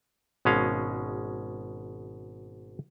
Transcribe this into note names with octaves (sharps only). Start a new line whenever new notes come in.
G#1 B2 G#3 C#4 F5